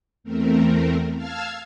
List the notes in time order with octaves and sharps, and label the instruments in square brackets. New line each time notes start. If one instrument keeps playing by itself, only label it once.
[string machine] E2 A3 C4 A#4
F5 A5 E6 F6 G#6